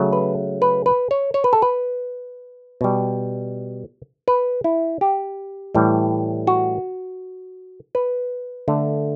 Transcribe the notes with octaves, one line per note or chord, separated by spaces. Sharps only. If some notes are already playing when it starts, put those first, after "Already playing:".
Already playing: C#3 F#3 A3
B4
B4
B4
C#5
C#5
B4
A4
B4
B2 G3
B4
E4
G4
A2 E3 G3
F#4
B4
D3 A3